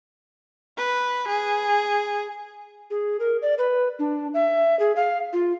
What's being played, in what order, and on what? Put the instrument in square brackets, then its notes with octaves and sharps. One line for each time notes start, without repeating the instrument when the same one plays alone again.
[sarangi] B4
G#4
[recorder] G#4
A#4
D5
B4
D4
E5
G#4
F5
F4